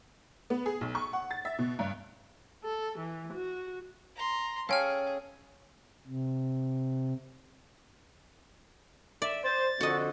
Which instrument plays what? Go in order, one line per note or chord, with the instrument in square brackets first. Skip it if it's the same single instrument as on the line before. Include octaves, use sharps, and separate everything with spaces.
[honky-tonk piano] B3
G#4
B1
C#6
F#5
A6
E5
B2
G2
[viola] A4
E3
F#4
[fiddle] A#5 C6
[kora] C#4 A4 [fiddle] G#4 [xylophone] F5 G5 F6
[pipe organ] C3
[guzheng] D5 [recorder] E5
[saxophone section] C5 [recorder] A6
[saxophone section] F2 D3 [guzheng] F#4 D#5